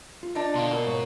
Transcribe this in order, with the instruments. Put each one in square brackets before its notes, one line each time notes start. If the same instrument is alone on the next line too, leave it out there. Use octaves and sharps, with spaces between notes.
[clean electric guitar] F4
[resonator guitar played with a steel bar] D4 D#4
[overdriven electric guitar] B2 [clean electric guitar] D3 F5 C6
[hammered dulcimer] A#2 [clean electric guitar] E4
[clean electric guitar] G#2 C#5